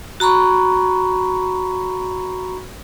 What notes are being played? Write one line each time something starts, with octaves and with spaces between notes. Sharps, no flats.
F#4 A#5 B5 C#6